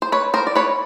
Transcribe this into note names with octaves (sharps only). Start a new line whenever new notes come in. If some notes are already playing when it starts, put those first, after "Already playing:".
C5
B4 C#5
A#4 C5
D5
B4 C#5